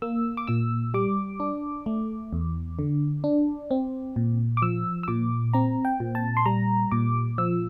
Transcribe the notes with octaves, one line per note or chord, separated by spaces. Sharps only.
A#3 E6
D6
A#2 E6
G3 D6
D4
A3
E2
D3
D4
C4
A#2
D6
F3 E6
E6
A#2 D6
C4 A#5
G5
A#2
A5
C6
G3 A#5
A#2 D6
F3 E6